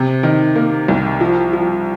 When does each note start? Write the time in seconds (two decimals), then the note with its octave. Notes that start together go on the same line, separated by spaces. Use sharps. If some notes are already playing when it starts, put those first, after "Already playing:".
Already playing: C3
0.23 D#3
0.56 A#3
0.88 C2
1.21 F3
1.53 F3